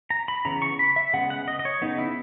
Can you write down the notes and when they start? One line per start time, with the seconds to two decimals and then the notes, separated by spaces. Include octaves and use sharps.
0.10 A#5
0.28 B5
0.45 C#3 E3 B3 A#5
0.62 C#6
0.79 B5
0.96 E5
1.13 C#3 G#3 B3 F#5
1.30 F#5
1.48 D#5
1.59 D#5
1.65 C#5
1.82 C#3 G#3 B3 D#4
1.98 E4